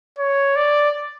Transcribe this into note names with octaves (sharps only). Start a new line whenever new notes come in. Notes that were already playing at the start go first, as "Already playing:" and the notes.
C#5
D5